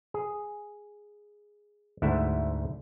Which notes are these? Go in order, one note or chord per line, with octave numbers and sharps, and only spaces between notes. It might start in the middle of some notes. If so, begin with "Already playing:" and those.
G#4
D2 G#2 A3 E4 E5 F#5